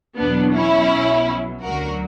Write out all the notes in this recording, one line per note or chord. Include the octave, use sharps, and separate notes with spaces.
E2 B2 F#3 B3 D4
C#4 E4
B1 B2 F#3
D2 D3 F#3 F#4 A#4